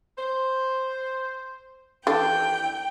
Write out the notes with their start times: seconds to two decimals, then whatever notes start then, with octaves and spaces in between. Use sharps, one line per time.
0.18 C5
2.07 D#2 E3 D4 A4 G5